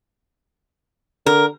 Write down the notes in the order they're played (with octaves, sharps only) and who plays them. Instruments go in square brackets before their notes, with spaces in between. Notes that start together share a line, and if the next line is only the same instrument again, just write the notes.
[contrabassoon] D3 [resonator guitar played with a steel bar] A#4